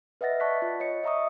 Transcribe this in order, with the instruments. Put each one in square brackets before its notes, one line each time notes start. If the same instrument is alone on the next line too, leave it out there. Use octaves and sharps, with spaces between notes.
[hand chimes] B4 D#5 E5 F#5 A6 A#6
D5 A5 C#6 F#6 B6
F4
C#5 D#5 C#7
D#5 E5 A#5 C#6 D#6